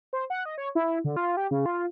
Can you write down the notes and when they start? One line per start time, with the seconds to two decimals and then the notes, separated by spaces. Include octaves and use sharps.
0.13 C5
0.30 F#5
0.45 D#5
0.58 C#5
0.75 E4
1.04 D3
1.17 F4
1.37 G4
1.51 C#3
1.66 F4